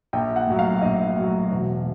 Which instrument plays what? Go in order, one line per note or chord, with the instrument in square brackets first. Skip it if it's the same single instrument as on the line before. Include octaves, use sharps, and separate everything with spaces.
[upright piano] A#1 G5
F#5
A2 F#3
F5
A#1 D#5
A2 F#3
E1